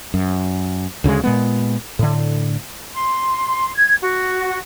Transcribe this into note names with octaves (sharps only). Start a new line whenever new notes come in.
F#2
D2 C#3 E3 G#3
A#2 G#3 B3
A2 D3
C6
G#6
F#4